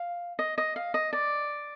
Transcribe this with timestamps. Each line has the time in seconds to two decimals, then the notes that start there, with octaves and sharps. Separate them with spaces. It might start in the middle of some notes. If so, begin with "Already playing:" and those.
Already playing: F5
0.39 D#5
0.58 D#5
0.76 F5
0.94 D#5
1.13 D5